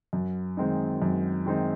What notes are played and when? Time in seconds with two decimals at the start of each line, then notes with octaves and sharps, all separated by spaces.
0.13 F#2
0.57 D#3 G#3 C4 D#4
1.02 F#2
1.46 D#3 G#3 C4 D#4